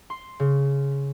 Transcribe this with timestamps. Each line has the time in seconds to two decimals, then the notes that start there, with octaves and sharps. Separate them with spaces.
0.10 C6
0.40 C#3